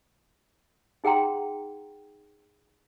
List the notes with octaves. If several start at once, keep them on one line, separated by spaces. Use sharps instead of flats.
D#4 G#4 F#5 G5 A#5 C6